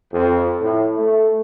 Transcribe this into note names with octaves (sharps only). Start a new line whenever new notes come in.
F2
A2
A3